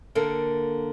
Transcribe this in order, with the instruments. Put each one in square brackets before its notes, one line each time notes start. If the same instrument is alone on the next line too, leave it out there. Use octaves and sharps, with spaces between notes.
[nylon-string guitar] D3 A#3 A4 A#4